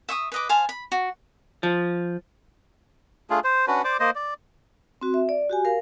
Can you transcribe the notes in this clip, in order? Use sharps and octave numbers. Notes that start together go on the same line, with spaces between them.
E5 C#6 D#6
B4 D#5 D6
C5 F5 G#5 A5
B5
F#4
F3
A3 D4 F4 G#4
C5
C#4 D4 F#4 B4
C5 D5 D6
A#3 C5 D#5
D5
C4 F#4
E5
D5
F#4 G4 G#5
A#4 F5